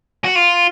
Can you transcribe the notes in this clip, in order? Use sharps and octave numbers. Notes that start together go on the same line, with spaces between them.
F#4
F4